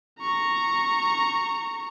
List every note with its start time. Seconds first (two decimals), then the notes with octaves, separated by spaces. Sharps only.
0.20 A#5 C#6